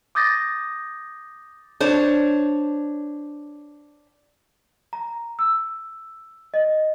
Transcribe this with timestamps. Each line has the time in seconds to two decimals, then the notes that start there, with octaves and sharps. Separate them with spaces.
0.15 D6 D#6 G6 A6 A#6
1.80 D4 C5 C#5
4.93 A#5
5.39 E6
6.54 D#5